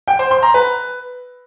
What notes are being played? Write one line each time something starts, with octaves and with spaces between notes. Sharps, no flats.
G5
C5
C6
A#5
B4